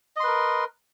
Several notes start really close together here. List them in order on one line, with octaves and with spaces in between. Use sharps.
D#5 C6 B4 A#4